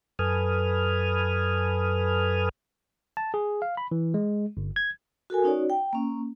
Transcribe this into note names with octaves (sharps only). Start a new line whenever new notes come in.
F#2 A4 B4 G#5 D#6 F6
A5
G#4
F5
B5
E3
G#3
G1
G#6
F#4 A4 A#4 G#5
C#4 D#4 F#4 C#5 D5
G5
A#3 C#4